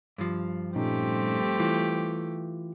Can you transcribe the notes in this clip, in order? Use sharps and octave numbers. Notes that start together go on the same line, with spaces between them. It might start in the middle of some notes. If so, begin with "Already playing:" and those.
G2 F3
A#2 G3 A3 C4 C#4 D#4 G4
E3 F4